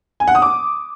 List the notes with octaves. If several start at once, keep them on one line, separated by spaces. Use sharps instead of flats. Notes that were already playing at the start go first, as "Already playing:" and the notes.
G#5
F#5
D#6
D6